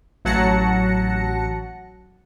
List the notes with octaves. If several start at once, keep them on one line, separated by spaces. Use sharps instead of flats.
A1 F#3 F#5 A5 A#6 C#7